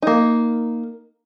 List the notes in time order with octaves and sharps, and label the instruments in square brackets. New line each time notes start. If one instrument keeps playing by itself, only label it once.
[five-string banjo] A#3 D#4